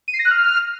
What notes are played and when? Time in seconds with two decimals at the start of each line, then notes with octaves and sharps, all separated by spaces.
0.08 D#7
0.14 C7
0.19 A#6
0.25 F#6
0.31 F6